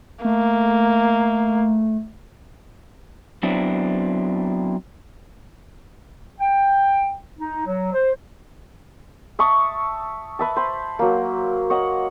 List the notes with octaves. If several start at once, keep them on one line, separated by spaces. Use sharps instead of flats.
A3 A#3
F#3 B3 C4 D4 E4
G5
D#4
F#3
C5
E5 A5 C#6 D#6
B4 E5 A5
C5 B5
F#3 A#3
C#5 D#5 F#5